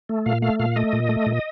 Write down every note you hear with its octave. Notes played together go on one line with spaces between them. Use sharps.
A3
A#2 F5
A3 F5
A#2 F5
A3 D#5
A#2
A3
A#2